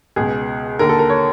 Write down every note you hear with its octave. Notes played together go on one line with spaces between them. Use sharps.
C#2 B2 G#4
D#2 D3 A#4
A4
A#4
C#5